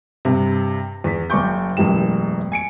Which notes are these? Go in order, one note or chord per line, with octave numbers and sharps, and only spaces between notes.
G2 C3
E2 B6
F#1 D5 G#5 C#6 D6 G6
E1 A1 F#2 E3 G4 E7
G#5 C#7 D7